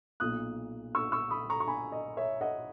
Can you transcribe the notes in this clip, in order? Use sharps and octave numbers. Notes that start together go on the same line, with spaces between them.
B1 A#2 D#6 F#6
C#6 E6
C#6 E6
B5 D#6
A#5 C#6
C#6
G#5 B5
D#5
C#5 E5
D#5 F#5